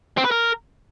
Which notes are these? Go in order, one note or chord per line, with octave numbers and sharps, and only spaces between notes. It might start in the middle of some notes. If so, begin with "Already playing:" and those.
C4
B4
A#4